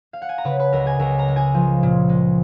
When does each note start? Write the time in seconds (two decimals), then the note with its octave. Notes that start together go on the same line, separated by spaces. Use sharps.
0.13 F5
0.22 F#5
0.29 G#5
0.38 A#5
0.44 C#3 B4 B5
0.60 B4 B5
0.73 C#2 A#4 A#5
0.86 G#4 G#5
0.99 C#2 A#4 A#5
1.19 A#4 A#5
1.28 G#3
1.36 G#4 G#5
1.54 F3
1.83 A#2
2.09 G#3